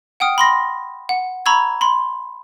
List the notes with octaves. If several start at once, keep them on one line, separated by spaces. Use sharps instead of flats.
F#5 G5 D#6 F6
B5 C6 A#6
F#5
A#5 B5 C#6 E6 G#6
B5 C6